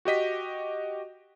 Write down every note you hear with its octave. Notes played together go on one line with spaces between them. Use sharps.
F#4 G4 D#5 B6